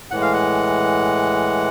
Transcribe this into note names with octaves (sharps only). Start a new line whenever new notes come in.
A2 E3 G#3 F#5
F5
F#5